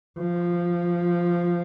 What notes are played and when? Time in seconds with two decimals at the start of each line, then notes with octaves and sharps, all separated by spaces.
0.19 F3